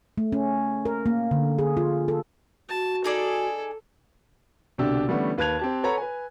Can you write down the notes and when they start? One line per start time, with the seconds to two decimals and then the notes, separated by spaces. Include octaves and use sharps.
0.18 A3
0.32 C#4
0.85 A#4
1.06 A#3
1.31 D3
1.59 G#4
1.77 F4
2.08 A4
2.69 F#4 A5
3.04 D#4 G#4 A4 D5
4.78 C2 B2 D3 D4 G4 E6
5.07 D3 E3 G3 A3 B3 C#4
5.38 D#2 B4 A5 F#6 G#6 F7
5.59 C4 G4 A5
5.83 A4 B4 C#5 F#5 A#5 B5
5.98 B4 G#5